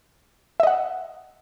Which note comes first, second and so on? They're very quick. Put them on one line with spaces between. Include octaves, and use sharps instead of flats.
E5 D#5 F#5